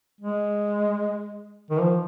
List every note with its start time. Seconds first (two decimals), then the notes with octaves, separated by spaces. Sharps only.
0.20 G#3
1.71 D#3
1.81 F3